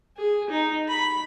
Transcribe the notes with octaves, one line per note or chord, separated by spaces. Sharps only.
G#4
D#4
B5